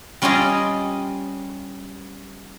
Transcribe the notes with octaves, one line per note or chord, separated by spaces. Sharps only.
G3 C#4 F4 G4 G#4 D#5